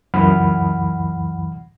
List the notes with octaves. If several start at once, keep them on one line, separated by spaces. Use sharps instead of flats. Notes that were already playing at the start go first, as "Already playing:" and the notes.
C#2 F#2 E3 F#5 B5 F6